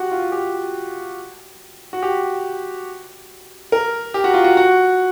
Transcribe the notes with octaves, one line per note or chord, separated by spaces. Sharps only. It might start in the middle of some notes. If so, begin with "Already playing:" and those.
Already playing: F#4 G4
F4
G4
F#4
G4
A#4
G4
F#4
F4
F#4
F#4